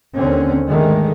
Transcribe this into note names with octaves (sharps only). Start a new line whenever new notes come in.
D#2 D3 C4 C#4
G#2 D3 D#3 G#3 A3